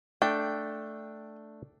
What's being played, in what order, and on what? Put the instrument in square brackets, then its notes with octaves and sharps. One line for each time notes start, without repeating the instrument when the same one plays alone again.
[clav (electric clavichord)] A3 D4 [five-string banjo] G5